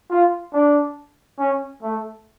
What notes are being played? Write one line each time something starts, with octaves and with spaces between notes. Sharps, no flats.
F4
D4
C#4
A3